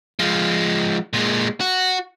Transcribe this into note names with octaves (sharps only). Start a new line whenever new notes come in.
F3 G#3
A#2 G#3
F#4